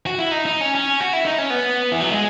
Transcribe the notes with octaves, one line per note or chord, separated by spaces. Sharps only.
F#4
E4
D#4
D#4
C#4
C#4
F#4
E4
D#4
C#4
B3
E3
F#3
G#3